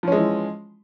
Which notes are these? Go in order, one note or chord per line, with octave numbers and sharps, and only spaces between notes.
E3 F3 G#3 C#4